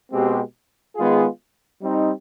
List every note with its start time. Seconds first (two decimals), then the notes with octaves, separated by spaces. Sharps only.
0.10 B2 G#3 C4 G4
0.95 D#3 G#3 B3 F4 G#4
1.81 G3 C4 D#4